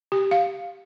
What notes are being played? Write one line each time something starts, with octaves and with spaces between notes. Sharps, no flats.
G4
F5